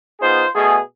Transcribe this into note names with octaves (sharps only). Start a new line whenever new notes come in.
B3 D#4 F4 G#4 C5
B2 A3 G#4